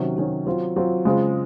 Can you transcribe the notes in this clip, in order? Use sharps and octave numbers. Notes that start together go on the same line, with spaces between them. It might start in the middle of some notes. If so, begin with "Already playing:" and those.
Already playing: C3 D#3 F#3 C#4
C3 D#3 F#3 C#4
F#3 C4 F4
F#3 C4 F4
C#3 G#3 C4 F4